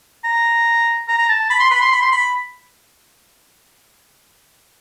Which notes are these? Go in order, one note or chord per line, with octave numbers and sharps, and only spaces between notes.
A#5
A#5
A#5
A5
B5
C6
B5
C6
B5
C6
B5